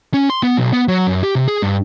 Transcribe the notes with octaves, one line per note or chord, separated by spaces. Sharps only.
C#4
C6
B3
B1
B3
F#3
F#2
G4
C3
G#4
G2